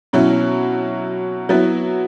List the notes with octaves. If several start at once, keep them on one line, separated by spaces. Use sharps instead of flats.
B2 F#3 C#4 E4
F#3 B3 E4